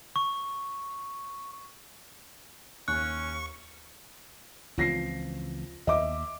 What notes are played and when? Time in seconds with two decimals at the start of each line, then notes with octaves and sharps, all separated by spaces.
0.16 C#6
2.88 D#2 C#4 C#6 F#6
4.78 C#2 E3 F3 C4 A#6 C7
5.87 D#2 D#5 E5 D6